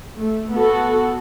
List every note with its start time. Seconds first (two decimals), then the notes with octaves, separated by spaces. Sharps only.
0.17 A3
0.53 B3 F#4 A4